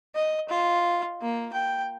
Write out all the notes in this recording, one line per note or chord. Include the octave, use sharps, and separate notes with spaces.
D#5
F4
A#3
G5